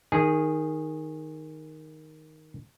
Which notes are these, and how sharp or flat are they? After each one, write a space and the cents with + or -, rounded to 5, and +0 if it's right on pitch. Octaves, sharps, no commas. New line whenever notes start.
D#3 +0 G#4 -15